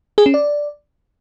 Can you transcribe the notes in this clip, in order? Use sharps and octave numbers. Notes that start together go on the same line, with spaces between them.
G#4
C#4
D5